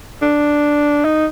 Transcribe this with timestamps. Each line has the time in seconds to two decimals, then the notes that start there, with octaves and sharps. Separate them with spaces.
0.22 D4
1.04 D#4